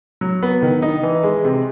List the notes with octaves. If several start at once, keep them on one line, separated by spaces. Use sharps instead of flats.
F#3
B3
D#3
D#4
E3
G#3
C3